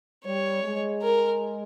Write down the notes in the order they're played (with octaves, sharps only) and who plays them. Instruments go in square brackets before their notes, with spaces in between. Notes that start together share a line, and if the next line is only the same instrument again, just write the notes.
[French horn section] G3 [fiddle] C#5
[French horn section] G#3
[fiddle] A#4